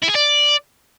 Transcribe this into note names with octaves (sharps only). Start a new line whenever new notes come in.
E4
G#4
D5